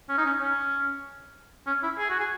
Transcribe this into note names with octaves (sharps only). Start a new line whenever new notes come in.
C#4
D#4
C#4
C#4
C#4
E4
G#4
F#4
G#4